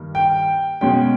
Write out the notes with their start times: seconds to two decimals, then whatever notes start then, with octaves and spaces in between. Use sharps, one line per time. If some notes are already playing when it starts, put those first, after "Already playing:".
Already playing: G2 D#3 A#3
0.15 G5
0.81 B2 G#3 C#4 G5